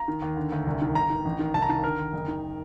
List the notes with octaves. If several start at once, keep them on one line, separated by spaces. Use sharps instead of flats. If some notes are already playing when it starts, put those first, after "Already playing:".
Already playing: A#5
D#3
D#2
D3
D2
C2
D#3
G1 A#5
D#3
A1
D#3
C2 A5
A#5
D#3 A5
D3 A#4
D#2
F#1
D#3